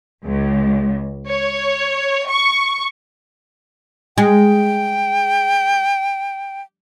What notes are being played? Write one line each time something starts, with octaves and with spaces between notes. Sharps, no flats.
C#2
C#5
C#6
G#3 G5